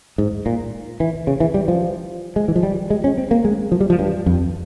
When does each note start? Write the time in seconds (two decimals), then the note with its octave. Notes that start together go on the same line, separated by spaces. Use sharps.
0.18 G#2
0.46 A#2
1.00 E3
1.27 C#3
1.40 E3
1.54 G3
1.68 F3
2.36 G#3
2.48 E3
2.56 F3
2.63 G3
2.90 G#3
3.04 C#4
3.18 C4
3.31 A#3
3.45 G#3
3.72 F3
3.81 G3
3.90 F3
3.99 G2
4.26 F2